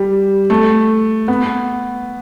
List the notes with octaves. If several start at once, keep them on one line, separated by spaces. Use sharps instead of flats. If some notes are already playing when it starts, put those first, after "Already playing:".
Already playing: G3
A3
B3